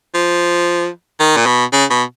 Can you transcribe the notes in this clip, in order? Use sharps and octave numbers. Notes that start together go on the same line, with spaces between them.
F3
D#3
A#2
B2
C#3
B2